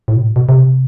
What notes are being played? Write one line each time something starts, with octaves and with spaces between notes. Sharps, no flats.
A2
B2
A2
B2
C3